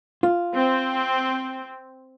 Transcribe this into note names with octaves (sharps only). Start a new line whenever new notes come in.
F4
C4